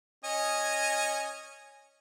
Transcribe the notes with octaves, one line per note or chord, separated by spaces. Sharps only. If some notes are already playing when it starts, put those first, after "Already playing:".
C#4 D#5 G#5